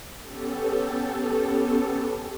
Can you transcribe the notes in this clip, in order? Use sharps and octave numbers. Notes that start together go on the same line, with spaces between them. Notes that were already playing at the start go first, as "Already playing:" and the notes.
B3 C#4 G4 A4